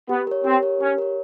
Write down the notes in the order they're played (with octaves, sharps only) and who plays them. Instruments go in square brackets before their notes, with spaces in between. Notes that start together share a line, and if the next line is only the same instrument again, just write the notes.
[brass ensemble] B3 [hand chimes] G4
[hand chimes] A#4 C#5
[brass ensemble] C4 [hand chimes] G4
[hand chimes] A#4 C#5
[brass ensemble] C#4 [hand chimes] G4
[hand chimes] A#4 C#5